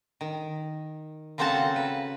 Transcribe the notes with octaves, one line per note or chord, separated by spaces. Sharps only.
D#3
C#3 A#3 C4 F#4 A4 A5
B4